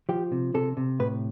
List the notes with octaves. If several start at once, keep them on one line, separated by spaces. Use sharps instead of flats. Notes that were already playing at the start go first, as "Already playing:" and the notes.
F3 G4
C3
C3 A4
C3
A2 B4